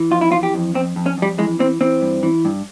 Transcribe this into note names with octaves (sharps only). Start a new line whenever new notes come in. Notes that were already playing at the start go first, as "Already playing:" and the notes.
Already playing: E3
F2 F4
E4
E3 F4
G4
F2
F2 C4
F2
C#4
F2 G3
E3 G#3
E3 C4
E3 C4
G2
E3
G2